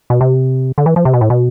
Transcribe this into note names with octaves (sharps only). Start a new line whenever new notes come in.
B2
C3
D3
E3
F3
C3
B2
A2
B2